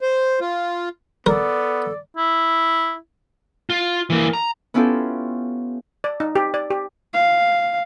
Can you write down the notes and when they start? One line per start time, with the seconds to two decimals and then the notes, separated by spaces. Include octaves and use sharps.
0.01 C5
0.41 F4
1.26 B3 A4 A#4 D5
2.17 E4
3.70 F4
4.10 E3 A#3
4.33 A#5
4.74 B3 C#4 E4 F4 G4 A4
6.04 D5
6.20 D#4
6.36 G4
6.54 D5
6.70 G4
7.13 F5